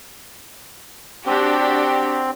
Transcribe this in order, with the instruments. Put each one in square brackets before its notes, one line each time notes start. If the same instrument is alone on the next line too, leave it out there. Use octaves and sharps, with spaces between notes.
[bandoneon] C4 [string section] D4 F#4 G4